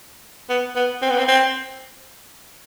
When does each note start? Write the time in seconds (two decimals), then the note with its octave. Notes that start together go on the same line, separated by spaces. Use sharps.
0.49 B3
0.75 B3
1.02 C4
1.10 B3
1.18 C4
1.28 C4